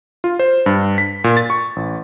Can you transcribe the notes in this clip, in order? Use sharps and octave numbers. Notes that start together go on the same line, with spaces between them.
F4
C5
G2
B6
A#2
A6
C#6
A1